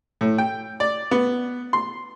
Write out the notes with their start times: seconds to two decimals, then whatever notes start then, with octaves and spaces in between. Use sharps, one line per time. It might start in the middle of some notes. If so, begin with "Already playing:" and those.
0.21 A2
0.38 G5
0.80 D5
1.11 B3
1.73 C6